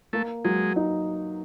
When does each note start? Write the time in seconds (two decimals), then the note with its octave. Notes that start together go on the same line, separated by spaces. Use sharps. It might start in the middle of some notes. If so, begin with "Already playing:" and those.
0.13 A3 A#3
0.44 F#3 G#3
0.76 D#4